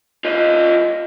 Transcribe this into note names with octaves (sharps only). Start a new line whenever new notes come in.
F4 D#5